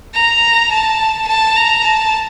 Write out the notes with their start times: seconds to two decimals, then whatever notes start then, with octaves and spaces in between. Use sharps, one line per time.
0.14 A#5
0.71 A5
1.27 A5
1.56 A#5
1.85 A5